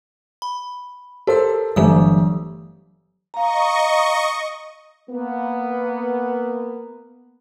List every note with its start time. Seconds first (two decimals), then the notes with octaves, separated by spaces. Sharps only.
0.42 B5
1.27 G4 A4 A#4 C5 E6
1.76 G1 E3 F#3 A3 G4 D#6
3.34 D#5 F5 A#5 C#6
5.10 A#3 B3